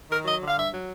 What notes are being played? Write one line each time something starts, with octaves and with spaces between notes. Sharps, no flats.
D#3 A#4
F#3 D#5
D3
F5
G2 E5
F#3